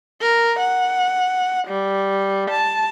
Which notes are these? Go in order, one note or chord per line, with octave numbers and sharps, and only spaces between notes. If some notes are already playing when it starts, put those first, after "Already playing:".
A#4
F#5
G3
A5